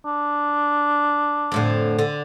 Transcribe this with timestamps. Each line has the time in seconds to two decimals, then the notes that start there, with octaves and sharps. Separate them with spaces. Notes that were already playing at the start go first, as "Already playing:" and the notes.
0.05 D4
1.52 F2 A2 D3
1.99 D3